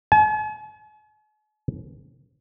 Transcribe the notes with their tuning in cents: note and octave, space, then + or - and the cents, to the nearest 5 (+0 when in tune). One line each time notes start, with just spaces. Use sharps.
G#5 +45